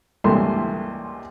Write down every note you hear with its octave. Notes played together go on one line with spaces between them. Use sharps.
C#2 G2 E3 A#3 A4 C6